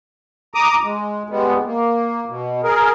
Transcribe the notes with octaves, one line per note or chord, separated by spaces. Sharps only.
A#5 D6 D#6
G#3
G3 G#3 B3
A#3
B2
G#4 A#4